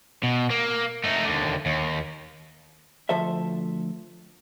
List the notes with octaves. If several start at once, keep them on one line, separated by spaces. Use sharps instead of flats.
B2
A#3
A3 D#4
D#2 D3
D#2
D2 F3 A4 C5 E5